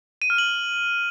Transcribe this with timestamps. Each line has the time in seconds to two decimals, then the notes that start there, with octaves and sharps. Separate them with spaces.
0.22 D#7
0.30 F6
0.38 F#7